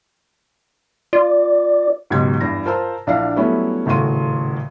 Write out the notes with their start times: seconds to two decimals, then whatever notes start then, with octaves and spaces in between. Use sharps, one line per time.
1.13 F4 D5
2.10 C#2 G#2 B2 F#3 G4 G#6
2.40 E2 G2 A#6
2.65 F4 A#4 C5 A5 A#5 E6
3.07 A#1 D4 E4 D5 F5 C7
3.36 F#3 G3 A3 B3 C#4 E4
3.86 D#1 A2 C#3 F#4 C6 D#7